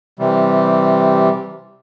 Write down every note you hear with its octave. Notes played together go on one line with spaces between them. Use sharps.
C3 E3 G3